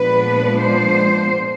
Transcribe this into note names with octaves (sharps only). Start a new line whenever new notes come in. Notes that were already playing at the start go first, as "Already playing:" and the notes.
Already playing: A#2 F3 G#3 B3 D4 B4
C5